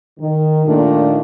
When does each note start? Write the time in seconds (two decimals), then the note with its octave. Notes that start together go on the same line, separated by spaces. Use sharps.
0.19 D#3
0.66 A#2 D#3 A3 A#3 D4